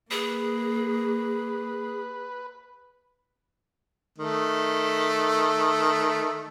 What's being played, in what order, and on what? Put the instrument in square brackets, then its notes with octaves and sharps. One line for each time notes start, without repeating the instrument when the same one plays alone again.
[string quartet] A#3 [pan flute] G#4 [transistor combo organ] B4
[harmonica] D#3 A3